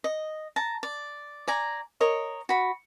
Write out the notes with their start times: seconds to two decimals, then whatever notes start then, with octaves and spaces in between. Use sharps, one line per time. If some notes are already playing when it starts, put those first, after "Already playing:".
0.04 D#5
0.56 A5 A#5
0.83 D5
1.48 D5 G#5 A#5
2.00 A#4 C#5 D#5
2.49 F#4 B5